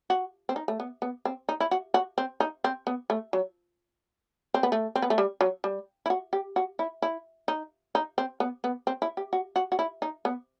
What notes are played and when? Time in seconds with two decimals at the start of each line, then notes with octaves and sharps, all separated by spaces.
0.10 F#4
0.49 C4
0.56 D#4
0.68 A3
0.80 B3
1.02 B3
1.25 C4
1.49 D#4
1.60 E4
1.71 F#4
1.94 F#4
2.18 C4
2.40 D#4
2.64 C4
2.87 B3
3.10 A3
3.33 F#3
4.54 C4
4.63 B3
4.72 A3
4.95 C4
5.02 B3
5.10 A3
5.18 G3
5.41 F#3
5.64 G3
6.06 E4
6.10 F#4
6.33 G4
6.56 F#4
6.79 E4
7.02 E4
7.48 D#4
7.95 D#4
8.18 C4
8.40 B3
8.64 B3
8.87 C4
9.02 E4
9.17 G4
9.33 F#4
9.56 F#4
9.72 F#4
9.79 E4
10.02 D#4
10.25 B3